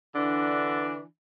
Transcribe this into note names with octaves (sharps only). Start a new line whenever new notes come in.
D3 E3 D4